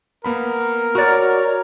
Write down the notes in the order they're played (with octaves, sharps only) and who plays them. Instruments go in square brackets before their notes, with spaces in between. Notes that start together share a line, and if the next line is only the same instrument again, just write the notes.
[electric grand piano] A#3 B3 B5 [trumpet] A#4
[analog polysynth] F#4 D5 [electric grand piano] C#5 F6 [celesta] A#5 A6